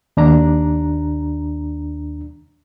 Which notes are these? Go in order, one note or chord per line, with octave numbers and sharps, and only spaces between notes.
D#2 D4 A#5